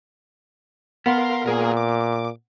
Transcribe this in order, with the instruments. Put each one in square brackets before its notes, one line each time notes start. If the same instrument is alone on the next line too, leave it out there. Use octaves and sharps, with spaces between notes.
[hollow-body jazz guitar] B3 [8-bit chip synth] A#4 F5 C6
[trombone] A#2 [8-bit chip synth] A#3 G#4 A#4
[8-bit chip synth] D6